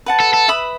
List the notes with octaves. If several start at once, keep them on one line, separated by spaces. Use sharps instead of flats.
B4 F#5 A5
A4
A4
B4 E5 B5 D#6